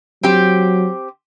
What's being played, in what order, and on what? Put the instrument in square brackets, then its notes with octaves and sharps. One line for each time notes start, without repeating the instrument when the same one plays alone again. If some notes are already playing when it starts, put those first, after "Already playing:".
[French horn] F#3 [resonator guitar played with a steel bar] C4 G4